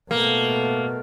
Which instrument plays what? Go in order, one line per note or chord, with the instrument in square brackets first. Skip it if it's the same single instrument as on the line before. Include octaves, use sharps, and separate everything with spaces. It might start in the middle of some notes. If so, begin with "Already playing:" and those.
[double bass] B2 A3 [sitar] A#3